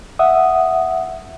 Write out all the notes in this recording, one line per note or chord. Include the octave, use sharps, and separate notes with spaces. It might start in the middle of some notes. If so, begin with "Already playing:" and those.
E5 F#5 D#6